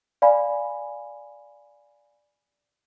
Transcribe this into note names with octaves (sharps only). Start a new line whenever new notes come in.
D5 F5 G#5 B5